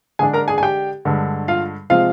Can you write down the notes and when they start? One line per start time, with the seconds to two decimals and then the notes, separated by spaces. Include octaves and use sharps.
0.19 D3 G#3 D4 G#4 G#5
0.33 A#4 A#5
0.48 G#4 G#5
0.58 G#5
0.63 G4 G5
1.05 G2 D3 G#3
1.48 F4 F5
1.90 C3 F3 G#3 C4 F4 F5